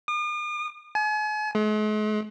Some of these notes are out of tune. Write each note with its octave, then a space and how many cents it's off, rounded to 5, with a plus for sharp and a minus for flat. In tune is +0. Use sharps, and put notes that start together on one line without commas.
D#6 -45
G#5 +40
G#3 +45